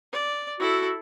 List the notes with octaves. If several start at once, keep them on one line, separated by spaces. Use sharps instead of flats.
D5
E4 F#4 A4